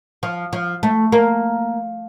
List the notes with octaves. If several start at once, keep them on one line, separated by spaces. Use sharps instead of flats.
F3
F3
A3
A#3